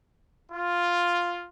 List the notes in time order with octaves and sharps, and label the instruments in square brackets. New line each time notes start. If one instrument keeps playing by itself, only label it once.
[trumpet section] F4